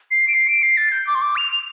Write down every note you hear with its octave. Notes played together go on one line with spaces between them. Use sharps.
C7
D7
C7
D7
C7
A6
G6
D6
C6
D6
F7
F7